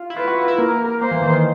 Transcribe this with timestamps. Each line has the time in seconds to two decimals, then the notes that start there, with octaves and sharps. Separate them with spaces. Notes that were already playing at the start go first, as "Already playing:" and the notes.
Already playing: F4
0.10 E4
0.17 F4 B4
0.27 F#4
0.38 F#4
0.48 E4
0.59 A#3 A#4
1.01 A#3 C5
1.12 E3
1.22 D#3
1.33 D#3